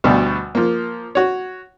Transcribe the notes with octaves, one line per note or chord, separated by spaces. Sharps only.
D2 B2 G3
F3 A#3
F#4 C#5